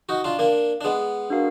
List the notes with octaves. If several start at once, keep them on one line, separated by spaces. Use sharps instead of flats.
D#4 F#4
D4 F4
A#3 D4
D4
G#3 B3
D4 F#4 A#4 F5